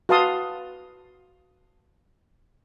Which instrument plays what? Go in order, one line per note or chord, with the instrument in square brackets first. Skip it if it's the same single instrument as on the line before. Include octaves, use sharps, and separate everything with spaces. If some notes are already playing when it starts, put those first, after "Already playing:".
[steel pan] F#4 B4 F5 A5 C6 D#6